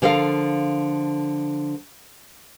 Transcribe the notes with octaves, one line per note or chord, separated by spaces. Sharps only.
D3 F3 A4 A#4 F5